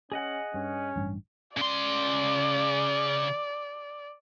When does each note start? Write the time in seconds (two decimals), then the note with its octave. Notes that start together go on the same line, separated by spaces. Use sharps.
0.12 C#4 G#4 D#5 F#5
0.54 G2 C#4
0.96 A1 G2
1.57 C#3 D5 C6